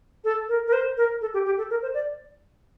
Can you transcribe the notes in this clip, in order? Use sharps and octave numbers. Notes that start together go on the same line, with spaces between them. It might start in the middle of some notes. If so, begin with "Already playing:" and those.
A4
A#4
A#4
C5
A#4
A4
G4
G4
A4
A#4
C5
D5